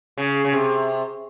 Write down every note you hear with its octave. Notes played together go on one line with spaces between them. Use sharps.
C#3
C#3
C3